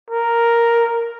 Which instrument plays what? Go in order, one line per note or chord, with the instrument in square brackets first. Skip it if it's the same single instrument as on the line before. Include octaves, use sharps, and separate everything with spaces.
[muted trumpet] A#4